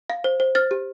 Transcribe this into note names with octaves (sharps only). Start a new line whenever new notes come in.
F5
C5
C5
C5 F6 A6
G4